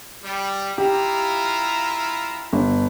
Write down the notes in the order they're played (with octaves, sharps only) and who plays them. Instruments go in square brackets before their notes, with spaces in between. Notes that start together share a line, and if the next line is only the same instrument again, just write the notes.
[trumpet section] G3
[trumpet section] E4 F4 A#5 [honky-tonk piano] G4
[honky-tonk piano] G1